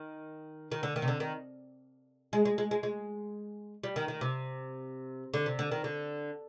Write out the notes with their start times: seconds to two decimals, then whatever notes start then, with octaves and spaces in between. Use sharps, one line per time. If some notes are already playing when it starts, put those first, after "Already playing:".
Already playing: D#3
0.72 D#3
0.83 D3
0.96 D#3
1.02 C3
1.08 D3
1.20 D#3
2.33 G#3
2.45 G#3
2.58 G#3
2.71 G#3
2.83 G#3
3.84 G3
3.96 D#3
4.08 D#3
4.21 C3
5.34 D3
5.46 C3
5.59 D3
5.72 D#3
5.84 D3